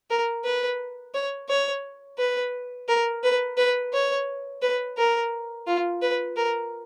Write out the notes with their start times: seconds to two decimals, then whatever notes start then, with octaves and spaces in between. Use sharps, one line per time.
0.10 A#4
0.44 B4
1.14 C#5
1.49 C#5
2.18 B4
2.88 A#4
3.23 B4
3.57 B4
3.93 C#5
4.62 B4
4.98 A#4
5.67 F4
6.02 B4
6.36 A#4